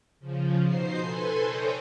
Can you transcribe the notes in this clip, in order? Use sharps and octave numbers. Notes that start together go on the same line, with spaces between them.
C#3 F3
B2 D#4 C5 C7
A4 B4 G#5 C6
A4 C5 C#5 D#5 G5